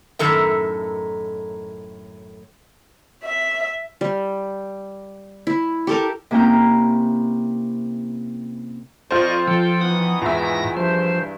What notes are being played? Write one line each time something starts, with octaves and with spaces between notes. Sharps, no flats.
F#2 A2 D#3 A4 A#4 E5
E5
G3
E4
G4 A4 A#4
C3 A#3 C#4 E4 G5 A#5
F2 F4 C5 D5 D#5 C#6
F3 A4 G5
D#3 E3 B3 F#5 D#6
E2 G#2 F4 G#4 E5 A#6
G2 F3 C5